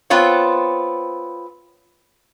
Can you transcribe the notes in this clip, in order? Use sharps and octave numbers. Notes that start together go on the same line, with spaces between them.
B3 C4 F4 C#5